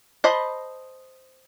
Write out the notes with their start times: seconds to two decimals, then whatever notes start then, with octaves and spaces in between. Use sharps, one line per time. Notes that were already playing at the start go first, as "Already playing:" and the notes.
0.24 C5 D#5 A5 B5